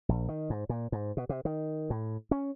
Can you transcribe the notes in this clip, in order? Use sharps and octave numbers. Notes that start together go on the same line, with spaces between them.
A#1
D#3
G#2
A#2
G#2
B2
C3
D#3
A2
C#4